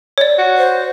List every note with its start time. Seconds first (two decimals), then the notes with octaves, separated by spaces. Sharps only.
0.18 C#5 D5
0.38 F#4
0.58 C5